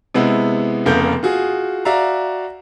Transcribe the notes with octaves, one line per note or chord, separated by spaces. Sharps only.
C3 G#3 B3 E4
F1 C#3 A#3 B3 A4 G6
F4 F#4 G#4
F#4 D5 E5 F5 A#5